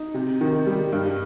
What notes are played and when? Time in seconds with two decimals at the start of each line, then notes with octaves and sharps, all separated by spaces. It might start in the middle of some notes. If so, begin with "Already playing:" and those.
Already playing: D#4
0.14 C3
0.41 D#3
0.67 G3
0.92 G2